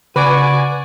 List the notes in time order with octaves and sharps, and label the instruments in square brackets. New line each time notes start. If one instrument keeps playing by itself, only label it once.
[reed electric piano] C#3 [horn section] F#4 D5 G#5 [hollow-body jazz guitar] B4